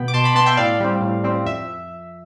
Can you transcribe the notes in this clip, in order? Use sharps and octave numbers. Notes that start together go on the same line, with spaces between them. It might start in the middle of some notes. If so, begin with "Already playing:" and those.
Already playing: B2 B3 G5 B5
D6
B2 A5 C6
B5 D6
B3 A5 C6
E5 G5
A2 D5 F5
G3 C4
A2
G3 C4
F2 E5